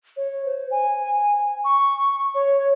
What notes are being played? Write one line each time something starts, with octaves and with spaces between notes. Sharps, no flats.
C#5
C5
G#5
C#6
C#5